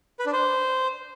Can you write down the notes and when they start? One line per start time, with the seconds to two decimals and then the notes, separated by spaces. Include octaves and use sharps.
0.19 B4
0.26 D4
0.33 C5